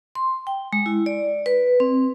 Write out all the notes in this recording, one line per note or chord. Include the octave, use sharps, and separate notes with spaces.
C6
G5
G#3
E4
D5
B4
C4